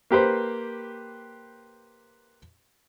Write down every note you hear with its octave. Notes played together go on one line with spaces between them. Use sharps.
A#3 G4 B4 C5